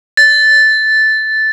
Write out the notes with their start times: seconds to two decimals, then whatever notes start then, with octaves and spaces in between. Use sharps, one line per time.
0.17 A6